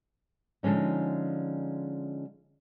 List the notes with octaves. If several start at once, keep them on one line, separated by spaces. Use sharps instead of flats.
D3 F3 G#3 C#4 D#4